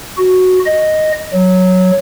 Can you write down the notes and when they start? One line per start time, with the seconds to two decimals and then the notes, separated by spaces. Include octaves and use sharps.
0.18 F#4
0.66 D#5
1.33 F#3